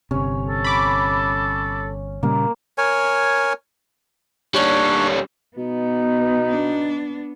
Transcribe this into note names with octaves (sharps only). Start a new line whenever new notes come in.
G1 C3 C#4
A4
B5 D6
A#2 C#3 G3 A#3
A#4 C#5 G#5
G3 C#4 D4 C#5
B2 B3 D#4
D4